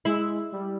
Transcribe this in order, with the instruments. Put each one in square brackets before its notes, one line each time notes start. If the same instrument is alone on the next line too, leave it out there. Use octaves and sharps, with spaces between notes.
[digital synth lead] G#3 [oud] E4
[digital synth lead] G3